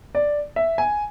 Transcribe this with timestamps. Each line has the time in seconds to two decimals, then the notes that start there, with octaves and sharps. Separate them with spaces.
0.15 D5
0.56 E5
0.78 G#5